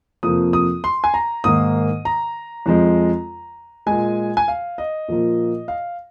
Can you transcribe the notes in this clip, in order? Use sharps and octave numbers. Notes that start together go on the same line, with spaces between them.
F2 C3 F3 A#3 D#6
D#6
C6
G#5
A#5
G#2 D#3 A#3 D#6
A#5
F2 F3 G#3
A#2 G#3 G#5
G#5
F5
D#5
A#2 F3 A#3
F5